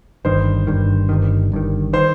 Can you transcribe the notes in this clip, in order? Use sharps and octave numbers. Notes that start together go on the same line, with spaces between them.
G1 G2 D#3 C5
G1 G2 D#3
G1 G2 D#3
G1 G2 D#3
D#3 C5